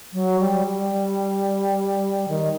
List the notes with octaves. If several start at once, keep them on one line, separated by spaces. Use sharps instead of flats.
F#3
G3
G3
D#3